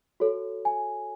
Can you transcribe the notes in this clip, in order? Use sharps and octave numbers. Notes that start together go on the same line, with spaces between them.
F#4 A4 C#5
G#5